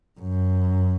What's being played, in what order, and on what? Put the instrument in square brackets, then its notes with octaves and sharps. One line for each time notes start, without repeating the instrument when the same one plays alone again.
[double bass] F#2